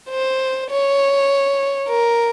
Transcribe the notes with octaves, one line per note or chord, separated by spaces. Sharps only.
C5
C#5
A#4